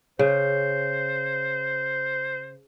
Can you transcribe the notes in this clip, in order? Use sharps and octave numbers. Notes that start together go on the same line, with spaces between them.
C#3 C5